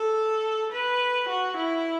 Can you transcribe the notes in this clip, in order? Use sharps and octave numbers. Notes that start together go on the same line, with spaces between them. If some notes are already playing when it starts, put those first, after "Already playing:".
Already playing: A4
B4
F#4
E4